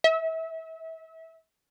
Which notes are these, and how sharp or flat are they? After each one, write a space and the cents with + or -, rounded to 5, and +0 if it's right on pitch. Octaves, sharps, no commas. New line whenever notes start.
E5 -35